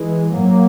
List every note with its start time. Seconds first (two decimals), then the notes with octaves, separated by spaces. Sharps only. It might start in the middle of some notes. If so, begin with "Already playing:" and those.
Already playing: E3 G#3
0.33 G#2 F#3 A#3